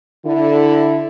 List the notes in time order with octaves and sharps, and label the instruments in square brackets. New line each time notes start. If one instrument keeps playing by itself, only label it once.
[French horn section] D3 E4